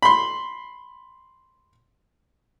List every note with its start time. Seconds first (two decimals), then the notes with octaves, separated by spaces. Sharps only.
0.02 B5 C6